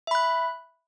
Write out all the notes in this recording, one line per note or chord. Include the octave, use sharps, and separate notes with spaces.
E5 B5 F#6